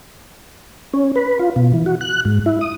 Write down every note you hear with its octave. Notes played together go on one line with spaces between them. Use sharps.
C#4
B4
F4
B2
E3
F#4
F#6
G#2
E4
D#6